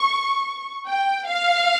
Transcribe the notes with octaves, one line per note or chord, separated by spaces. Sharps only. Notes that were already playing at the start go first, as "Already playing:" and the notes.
Already playing: C#6
G5
F5